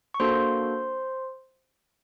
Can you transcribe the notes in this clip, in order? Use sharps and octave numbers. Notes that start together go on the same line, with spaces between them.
C#6
A#3 D4 F#4 A4 C5 C6